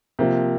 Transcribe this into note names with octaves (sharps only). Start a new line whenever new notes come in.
C3 F3 A#3